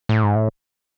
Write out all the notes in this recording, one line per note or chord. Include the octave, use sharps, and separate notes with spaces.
A2
G#2
A2